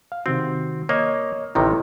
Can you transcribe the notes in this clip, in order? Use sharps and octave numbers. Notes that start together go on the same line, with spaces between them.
F5
C3 D#3 C4 F#4
A#3 C#5 D#5
A1 C3 D#3 E4 A#5